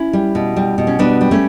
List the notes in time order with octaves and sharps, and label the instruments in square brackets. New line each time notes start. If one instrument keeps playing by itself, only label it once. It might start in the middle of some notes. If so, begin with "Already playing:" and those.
Already playing: [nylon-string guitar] C#4 E4
G3
B2
G3
B2
C#4
G3 B3 D4
G3
A3 C#4